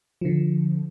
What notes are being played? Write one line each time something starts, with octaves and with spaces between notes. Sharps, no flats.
D3 F3